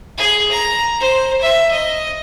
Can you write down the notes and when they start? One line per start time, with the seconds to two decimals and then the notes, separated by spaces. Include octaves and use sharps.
0.18 G#4
0.52 A#5
1.00 C5
1.41 E5
1.71 D#5